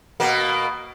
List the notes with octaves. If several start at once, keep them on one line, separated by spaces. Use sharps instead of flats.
B2 A#3